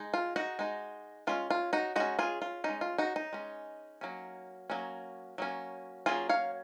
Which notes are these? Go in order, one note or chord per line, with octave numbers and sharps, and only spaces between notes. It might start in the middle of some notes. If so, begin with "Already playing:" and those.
Already playing: G#3 D#4
F4
D#4 F#4
G#3 D#4
G#3 C#4 F4
F4
D#4 F#4
G#3 C#4 D#4 F#4
F4 G#4
F4
G#3 C#4 D#4
F4
D#4 F#4
D#4
G#3 C#4
F#3 A#3 C#4
F#3 A#3 C#4
F#3 A#3 C#4
F#3 A#3 C#4 F4 G#4
C#5 F5